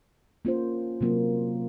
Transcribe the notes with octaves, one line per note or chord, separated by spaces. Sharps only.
A#3 C#4 F4 C5
C3 F#3 A#3 F4